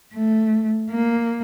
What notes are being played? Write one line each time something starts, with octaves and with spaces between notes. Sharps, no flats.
A3
A#3